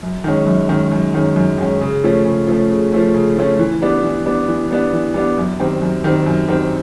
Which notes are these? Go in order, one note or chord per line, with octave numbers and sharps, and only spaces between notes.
F#2
D#3 G#3 C#4
F#2
D#3 G#3 C#4
F#2
D#3 G#3 C#4
F#2
D#3 G#3 C#4
C#3
F3 A3 C#4
C#3
F3 A3 C#4
C#3
F3 A3 C#4
C#3
F3 A3 C#4
E3
G3 B3 D4
E3
G3 B3 D4
E3
G3 B3 D4
E3
G3 B3 D4
F#2
D#3 G3 C4
F#2
D#3 G3 C4
F#2
D#3 G3 C4